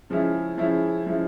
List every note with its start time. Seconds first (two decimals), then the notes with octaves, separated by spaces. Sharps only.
0.10 C#3 F3 G#3 C#4 E4
0.58 C#3 F3 G#3 C#4 E4
1.06 C#3 F3 G#3 C#4 E4